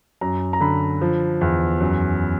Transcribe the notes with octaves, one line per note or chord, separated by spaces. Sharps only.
F#2 A#5
A#5
D3 B5
F3
E2
F#2